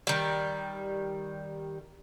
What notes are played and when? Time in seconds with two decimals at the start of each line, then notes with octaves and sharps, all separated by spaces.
0.07 D#3 G3